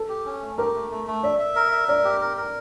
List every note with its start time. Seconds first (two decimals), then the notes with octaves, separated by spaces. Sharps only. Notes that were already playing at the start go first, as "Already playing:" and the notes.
Already playing: A4
0.09 G4
0.26 C#4
0.41 A3
0.58 G4 A#4
0.75 A3
0.91 A3
1.07 A3
1.23 D5 E5
1.39 E5
1.56 A#4
1.72 E5
1.88 A#4 D5
2.05 G4
2.21 A#4
2.37 A#4